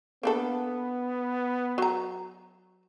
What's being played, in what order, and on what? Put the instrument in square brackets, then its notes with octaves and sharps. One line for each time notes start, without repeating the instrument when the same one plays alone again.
[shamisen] A#3 D4 A4 [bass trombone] B3
[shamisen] F#3 A#5